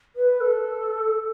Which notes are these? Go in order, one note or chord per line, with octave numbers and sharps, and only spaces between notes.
B4
A4